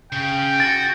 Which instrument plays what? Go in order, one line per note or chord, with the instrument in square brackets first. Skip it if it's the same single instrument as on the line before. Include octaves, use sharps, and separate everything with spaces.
[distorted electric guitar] C#3 [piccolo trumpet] G5
[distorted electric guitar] F#4 [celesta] A6